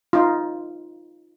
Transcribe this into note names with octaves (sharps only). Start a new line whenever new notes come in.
D#4 F4